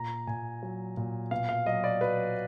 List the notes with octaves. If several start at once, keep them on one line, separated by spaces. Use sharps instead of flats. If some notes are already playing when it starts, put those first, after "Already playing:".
Already playing: A#2 A#5
A#2 G#5
F#3
A#2
B2 F5
F5
F#3 D#5
D5
F#3 B4